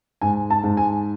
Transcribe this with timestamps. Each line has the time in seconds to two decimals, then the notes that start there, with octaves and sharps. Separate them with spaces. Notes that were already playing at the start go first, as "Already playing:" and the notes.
0.21 G#2 G#5
0.50 A5
0.64 G#2
0.77 G#5